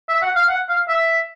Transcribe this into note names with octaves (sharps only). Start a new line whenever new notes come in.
E5
F#5
F5
F#5
F5
E5